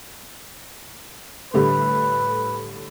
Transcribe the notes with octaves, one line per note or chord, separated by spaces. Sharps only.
A2 D3 G3 B4